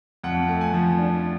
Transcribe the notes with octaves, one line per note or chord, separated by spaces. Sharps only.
F2 F#5
A3
G#5
F3
D4